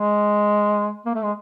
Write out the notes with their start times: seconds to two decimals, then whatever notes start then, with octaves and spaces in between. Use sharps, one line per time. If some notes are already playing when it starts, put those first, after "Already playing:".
Already playing: G#3
1.05 A#3
1.14 A3
1.23 G#3